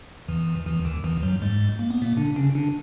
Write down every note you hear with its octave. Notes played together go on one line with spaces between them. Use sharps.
E2 E3
E2 E3
D#2 D#3
E2 E3
F#2 F#3
G#2 G#3
A#3
B3
A#2 A#3
D3 D4
C#3 C#4
D3 D4